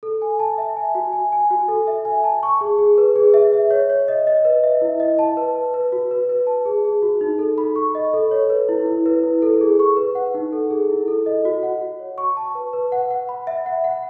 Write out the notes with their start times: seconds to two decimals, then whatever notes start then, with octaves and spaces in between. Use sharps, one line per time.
0.03 A4
0.22 G#5
0.39 A5
0.58 E5
0.77 G#5
0.95 F#4
1.13 G#5
1.32 G#5
1.51 F#4
1.68 A4
1.87 E5
2.05 G#5
2.24 A5
2.43 C#6
2.61 G#4
2.79 G#4
2.98 B4
3.16 G#4
3.34 E5
3.53 E5
3.71 C#5
3.90 C#5
4.08 D#5
4.27 D#5
4.45 B4
4.64 E5
4.81 E4
5.00 D#5
5.19 A5
5.37 B4
5.55 B4
5.74 B4
5.92 F#4
6.11 B4
6.29 B4
6.47 A5
6.65 G#4
6.85 G#4
7.02 F#4
7.21 D#4
7.39 A4
7.58 B5
7.76 C#6
7.95 D#5
8.13 A4
8.31 C#5
8.50 B4
8.69 E4
8.86 E4
9.06 B4
9.23 E4
9.42 A4
9.61 G#4
9.79 C#6
9.97 B4
10.15 F#5
10.34 D#4
10.53 A4
10.70 G#4
10.89 E4
11.08 A4
11.26 D#5
11.45 F#4
11.63 F#5
11.81 F#4
11.99 C#5
12.18 C#6
12.37 A5
12.55 B4
12.73 B4
12.92 F#5
13.11 F#5
13.29 B5
13.47 E5
13.66 F#5
13.84 F#5